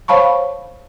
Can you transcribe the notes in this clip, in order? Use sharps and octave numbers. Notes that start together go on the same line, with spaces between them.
C5 C#5 F5 A5 B5 C#6